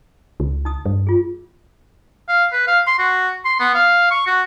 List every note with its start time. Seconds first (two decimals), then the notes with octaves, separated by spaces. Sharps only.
0.40 C#2
0.65 D#4 D#6
0.86 G2
1.07 F4 G#4
2.28 F5
2.53 B4
2.67 F5
2.87 C6
2.98 F#4
3.45 C6
3.60 B3
3.75 F5
4.10 C#6
4.27 F#4